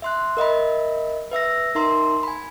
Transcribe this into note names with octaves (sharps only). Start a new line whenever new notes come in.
E5 C6 F#6
A#4 D#5 E5 B5
B4 E5 E6 A#6
D#4 A#4 E5 A#5 C6
G#5 B5